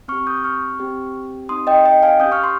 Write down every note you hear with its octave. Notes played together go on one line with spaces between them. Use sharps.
C4 G4 C#6 F6
D#6 G6
C#6 F6
C4 G4
C4 D#4 G4 C6 D#6
D#5 G5
D#5 G5
F5 G#5
C#4 D#6 G6
G4
C#6 F6
C6